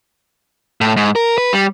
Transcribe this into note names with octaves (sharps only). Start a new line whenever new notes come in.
A2
G#2
A#4
B4
G3